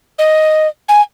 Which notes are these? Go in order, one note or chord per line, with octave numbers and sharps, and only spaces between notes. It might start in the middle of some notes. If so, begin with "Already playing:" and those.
D#5
G#5